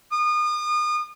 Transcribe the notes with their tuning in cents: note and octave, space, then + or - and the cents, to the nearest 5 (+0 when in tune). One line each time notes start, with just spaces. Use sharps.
D#6 -35